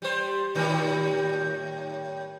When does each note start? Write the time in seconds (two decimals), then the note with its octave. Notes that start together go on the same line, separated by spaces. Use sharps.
0.02 G3 C5
0.55 A2 D#3 G3